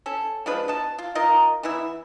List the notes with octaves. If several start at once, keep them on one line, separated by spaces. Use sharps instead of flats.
C#4 A4
F3 G#3 D4 B4
B2 A5
F4
D#4 F4 A#4 D#5
E3 B3 E4 E5